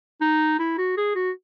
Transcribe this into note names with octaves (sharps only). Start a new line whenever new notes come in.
D#4
E4
F#4
G#4
F#4